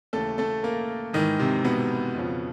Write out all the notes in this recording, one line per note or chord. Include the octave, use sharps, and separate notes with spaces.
D#2 C#3 E3 A3 A4
A3 A4
A#3 A#4
G#2 D#3 E3 D#4
C3 C4
B2 B3
F2 C#3 F3